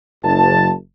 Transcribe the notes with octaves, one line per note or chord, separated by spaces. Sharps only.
F#1 A5